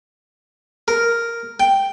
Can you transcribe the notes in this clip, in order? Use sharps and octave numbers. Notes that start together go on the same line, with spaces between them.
A#4
G5